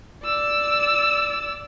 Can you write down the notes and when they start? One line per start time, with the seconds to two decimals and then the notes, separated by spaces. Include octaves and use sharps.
0.24 D5 E6